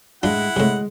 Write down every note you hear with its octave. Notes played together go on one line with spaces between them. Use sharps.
A2 G#3 D4 E4 F4 F#5
A2 C3 G#3